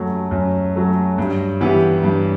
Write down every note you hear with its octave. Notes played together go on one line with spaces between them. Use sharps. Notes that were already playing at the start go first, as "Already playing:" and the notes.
Already playing: F#2 F#3 A3
F#2
F#3 A3
G2
E3 B3 E4 G4
G2